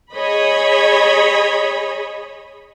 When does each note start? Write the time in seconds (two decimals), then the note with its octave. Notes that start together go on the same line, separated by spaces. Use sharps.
0.13 G#4 C#5 D#5 B5